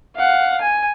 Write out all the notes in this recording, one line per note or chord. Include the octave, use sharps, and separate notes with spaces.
F5 F#5
G#5